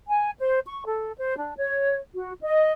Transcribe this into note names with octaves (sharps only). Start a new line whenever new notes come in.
G#5
C5
C#6
A4
C5
D4
C#5
F#4
D#5